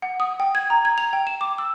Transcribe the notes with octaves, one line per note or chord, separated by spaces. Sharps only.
F#5
D#6
G5
G#6
A#5
G#6
F7
G5
E7
D6
E6